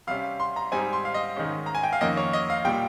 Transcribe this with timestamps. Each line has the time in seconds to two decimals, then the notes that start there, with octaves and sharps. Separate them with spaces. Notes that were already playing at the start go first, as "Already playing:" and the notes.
0.07 C3 G3 C#4 F5
0.40 C6
0.56 A#5
0.71 G#2 G3 C4 D#4 G#5
0.93 C6
1.05 F5
1.14 D#5
1.37 G#2 D#3 G#3 C#4
1.66 A#5
1.75 G#5
1.83 G5
1.93 F5
2.01 F2 D#3 A#3 C#4 D#5
2.17 C#5
2.33 D#5
2.50 F5
2.65 A#2 G3 G5